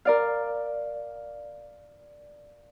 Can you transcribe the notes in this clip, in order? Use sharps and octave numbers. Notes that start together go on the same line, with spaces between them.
A#4 D5 F5